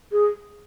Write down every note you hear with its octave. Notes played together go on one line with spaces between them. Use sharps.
G#4